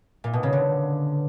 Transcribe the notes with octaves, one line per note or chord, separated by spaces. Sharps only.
A#2
B2
C#3
D3